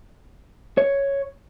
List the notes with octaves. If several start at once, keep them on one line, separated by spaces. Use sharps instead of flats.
C#5